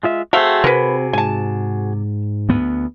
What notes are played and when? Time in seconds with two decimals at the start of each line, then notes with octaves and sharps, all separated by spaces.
0.03 G#3 F4 E5
0.33 A3 C4 F#4 G#4 F5
0.64 C3 C4 A#4 B4
1.13 G#2 G#5 A5
2.49 D2 B3